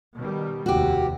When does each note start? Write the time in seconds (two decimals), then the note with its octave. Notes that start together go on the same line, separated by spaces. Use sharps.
0.16 B2 D#3 G3
0.66 F1 D#2 F#4 G4